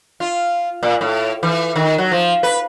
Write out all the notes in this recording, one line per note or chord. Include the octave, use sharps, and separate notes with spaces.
F4
A#2
A2
E3
D#3
F#3
F3
B4